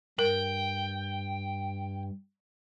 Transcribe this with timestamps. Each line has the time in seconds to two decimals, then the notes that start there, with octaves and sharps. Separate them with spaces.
0.19 G2 A#4 G5